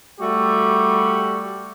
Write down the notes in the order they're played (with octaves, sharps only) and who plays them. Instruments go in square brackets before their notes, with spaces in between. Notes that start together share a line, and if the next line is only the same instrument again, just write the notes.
[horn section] G3 A3 F#4 G4